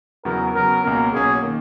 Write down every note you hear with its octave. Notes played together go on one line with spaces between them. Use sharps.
E2 C#3 F#3 B3 A#4
C#3 F#3 B3 A#4
C#2 B2 A#3 C#4 A#4
B1 B2 A#3 C#4 G#4
D#3 A#3